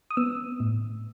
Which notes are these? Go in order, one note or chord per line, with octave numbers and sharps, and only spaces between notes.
D#6
B3 E6
A2